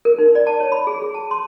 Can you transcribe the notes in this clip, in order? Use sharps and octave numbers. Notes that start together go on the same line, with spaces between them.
A#4
D#4
D5
A5
C#5
B5
G#4
G#4
A5
C6